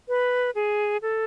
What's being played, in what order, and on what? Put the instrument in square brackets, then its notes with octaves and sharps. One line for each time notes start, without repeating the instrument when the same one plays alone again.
[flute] B4
G#4
A4